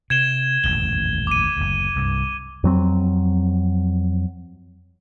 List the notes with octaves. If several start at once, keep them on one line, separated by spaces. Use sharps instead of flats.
C3 G#6 E7 G7
D#1 A1 F2 G7
D6 D#7
F#1 D2
C2 G2
F2 F#3 C4